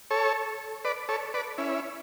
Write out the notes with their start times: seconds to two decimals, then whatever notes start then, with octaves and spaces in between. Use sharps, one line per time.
0.10 A4 C#5
0.84 B4 D5
1.09 A4 C#5
1.34 B4 D5
1.58 C#4 E4